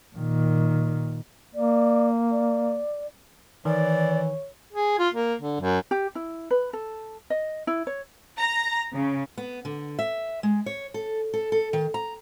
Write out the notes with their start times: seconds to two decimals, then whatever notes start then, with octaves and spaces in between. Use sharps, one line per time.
0.15 A#2 D#3
1.55 A#3 D5
2.31 D5
3.65 D#3 E3 C#5 D5
4.73 G#4
4.99 F4
5.14 A#3
5.42 D3
5.60 F#2
5.91 G4
6.15 E4
6.51 B4
6.73 A4
7.30 D#5
7.67 E4
7.87 C#5
8.38 A#5
8.92 C#3
9.38 B3
9.65 D3
9.99 E5
10.43 G#3
10.66 C#5
10.94 A4
11.34 A4
11.52 A4
11.73 D#3
11.94 A#5